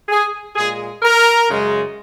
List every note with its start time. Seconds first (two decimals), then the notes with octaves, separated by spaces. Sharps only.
0.09 G#4
0.56 A#2 G#3 G#4
1.02 A#4
1.49 F#2 C#3 G#3